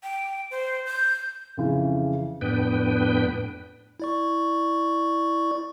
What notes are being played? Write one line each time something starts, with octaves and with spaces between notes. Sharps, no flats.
G5
C5
G6
F2 C#3 E3
F2 A2 B3 D4 B4 G5
E4 D5 C#6